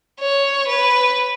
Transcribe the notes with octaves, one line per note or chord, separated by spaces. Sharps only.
C#5
B4